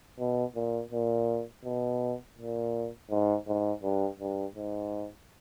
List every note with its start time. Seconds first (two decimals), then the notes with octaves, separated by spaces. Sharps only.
0.19 B2
0.55 A#2
0.92 A#2
1.65 B2
2.38 A#2
3.10 G#2
3.47 G#2
3.83 G2
4.20 G2
4.56 G#2